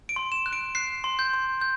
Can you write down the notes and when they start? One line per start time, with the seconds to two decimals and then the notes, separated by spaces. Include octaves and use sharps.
0.09 D7
0.16 C6
0.32 E7
0.46 F#6
0.53 D7
0.75 F#6 C7
1.04 C6
1.19 G6
1.33 C6
1.61 G6